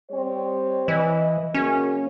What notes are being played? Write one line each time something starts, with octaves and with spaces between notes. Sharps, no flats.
G3 C4 C#5
E3 B4 D#5
C#3 F#3 A#3 C#4